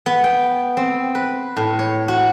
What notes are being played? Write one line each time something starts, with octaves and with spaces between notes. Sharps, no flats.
B3
G5
C4
B4
A2
C#5
F#4